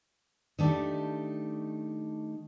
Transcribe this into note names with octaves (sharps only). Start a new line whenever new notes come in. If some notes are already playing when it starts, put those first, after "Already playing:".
D#3 A3 D4 D#4 G4